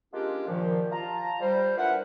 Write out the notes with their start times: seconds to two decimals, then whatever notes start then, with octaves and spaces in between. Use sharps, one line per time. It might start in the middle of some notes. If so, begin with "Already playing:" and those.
0.14 G#3 A#3 C#4 D4 F4 G4
0.48 A#2 D#3 F3
0.91 F4 A5 A#5
1.40 G3 C5
1.77 D4 E4 F4 A#4 B4 F#5